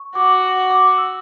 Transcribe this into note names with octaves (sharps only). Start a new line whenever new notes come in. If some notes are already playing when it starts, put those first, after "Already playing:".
Already playing: C#6
F#4 D6
D6
E6